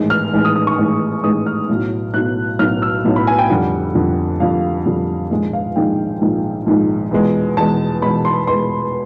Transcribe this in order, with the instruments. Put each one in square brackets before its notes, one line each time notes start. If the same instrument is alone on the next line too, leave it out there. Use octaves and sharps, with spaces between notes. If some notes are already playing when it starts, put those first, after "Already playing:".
Already playing: [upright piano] A1 G#2 D#3 G#3
F6
A1 G#2 D#3 G#3
D#6
D#6
C#6
A1 G#2 D#3 G#3
A1 G#2 D#3 G#3 D#6
F6
B1 A2 F#3
B1 A2 F#3 F#6
B1 A2 F#3 F6
E6
B1 A2 F#3
B5
G#5
G5
F2 D3 G3 F#5
F2 D3 G3
F2 D3 G3 F5
F2 D3 G3
A#1 G#2 D#3 G#3
F5
A#1 G#2 D#3 G#3 G5
A#1 G#2 D#3 G#3
A#1 G#2 D#3 G#3
E2 B2 G#3
E2 B2 G#3 A5
E2 B2 G#3 B5
C6
E2 B2 G#3 C6